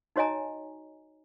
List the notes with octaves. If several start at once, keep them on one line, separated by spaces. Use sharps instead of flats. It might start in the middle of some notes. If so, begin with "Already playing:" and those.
D#4 F#4 C#5 D#5 G#5 A#5